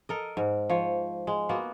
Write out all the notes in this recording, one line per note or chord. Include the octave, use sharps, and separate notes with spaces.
A4 A#4 D#5
G#2
F3 C#5
G#3
A#3 B3 F#4